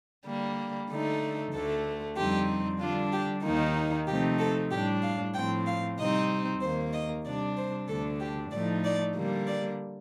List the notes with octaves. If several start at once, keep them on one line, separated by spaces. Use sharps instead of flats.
D3 G3 A#3
D3 A3 D#4
D2 D3 A3 A4
F2 D3 G3 C4 D#4 G4
D3 G3 D4 F4
G4
D#2 D#3 A#3 D#4
C3 F3 A3 C4 D#4 G4
A4
A2 G3 D4 G4
F5
A2 F3 C4 G5
F5
C3 G3 C4 D#4 D#5
D#2 D#3 A#3 C5
D#5
C3 G3 D4 D5
C5
D2 D3 A3 D4 A4
G4
A2 F3 A3 D#4 D5
D5
D3 G3 A#3
D5